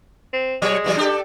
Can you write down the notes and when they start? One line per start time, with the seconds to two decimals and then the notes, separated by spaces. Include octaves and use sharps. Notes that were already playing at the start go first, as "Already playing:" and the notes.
0.33 C4
0.62 B2 F#3 G#3 C#5
0.84 B2 E3 F#3
0.97 D4 G4 A4